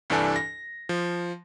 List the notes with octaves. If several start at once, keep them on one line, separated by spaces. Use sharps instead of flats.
C2 G2 E3 D4 A4 G#5
A#6
F3